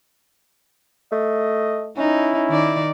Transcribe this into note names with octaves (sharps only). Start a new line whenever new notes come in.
A3 D#5
C#4 D#4 E4
D#3 D5